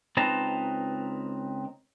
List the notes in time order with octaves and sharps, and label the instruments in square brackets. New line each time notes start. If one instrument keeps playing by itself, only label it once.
[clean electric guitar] C#2 C4 D#4 B4 A5 A#5